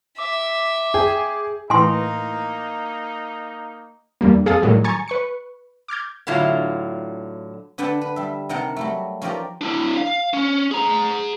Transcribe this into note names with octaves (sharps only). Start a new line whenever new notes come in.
E5 D6
G#4 G5
A2 E3 A#3 D#4 G#5 C6
E2 G2 G3 A#3
F2 G#4 A4 F5 D#6 A6
A2 D#3 F#3 G3
G#5 A#5 C#6 G#6 A6 C#7
B4 C#6 C#7
D6 F6 G6 G#6
A2 D3 F#3 E4 F4
D3 D4 B4 F#5 G5 A5
B4
G3 E5
C3 D#3 A#4 F#5 G5 A5
F#3 G3 A3
F3 C#4 D#4 G4 A#4 D5
D4 E4
F5
C#4
G#4 A#5